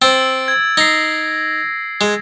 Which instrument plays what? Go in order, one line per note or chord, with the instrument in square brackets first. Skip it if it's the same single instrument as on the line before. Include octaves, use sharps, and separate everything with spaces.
[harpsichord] C4 [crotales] E6 A6 D7
[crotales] G#6
[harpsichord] D#4 [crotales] A#6 C7
[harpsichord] G#3